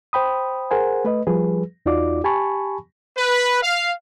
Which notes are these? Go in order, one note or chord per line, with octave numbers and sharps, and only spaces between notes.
C5 G5 B5 D#6
G#4 A#4 C5 F#5 G#5
A3 B4 D#5
F3 G3 G#4 B4
E2 D#4 F4 F#4 D5 D6
G4 G#5 A5 B5 C#6
B4
F5